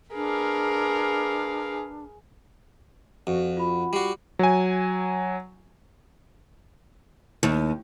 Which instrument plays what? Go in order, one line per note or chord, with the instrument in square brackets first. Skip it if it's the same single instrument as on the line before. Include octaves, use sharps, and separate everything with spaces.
[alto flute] D4 [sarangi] G#4 [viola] A#4 [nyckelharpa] B4 F5
[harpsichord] F2 [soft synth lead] F#4
[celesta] F4 B5
[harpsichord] G3 F#4 [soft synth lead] C7
[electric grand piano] F#3 G#5
[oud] D#2